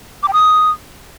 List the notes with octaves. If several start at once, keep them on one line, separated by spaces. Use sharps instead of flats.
D6
G5
D#6